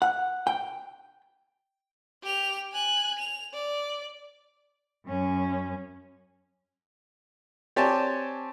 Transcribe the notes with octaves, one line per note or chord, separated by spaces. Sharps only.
F#5
G5
G4 F7
G#5 F#6
F7
D5
F#2 C#4
C4 G4 C#5 D5 G#5 A5